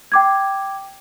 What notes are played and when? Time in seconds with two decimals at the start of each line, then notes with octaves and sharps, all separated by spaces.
0.12 G5 D6 G#6